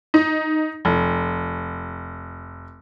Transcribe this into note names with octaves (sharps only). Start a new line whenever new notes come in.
D#4
F1